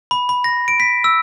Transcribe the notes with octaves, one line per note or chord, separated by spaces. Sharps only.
B5
B5
A#6
D7
B6
E6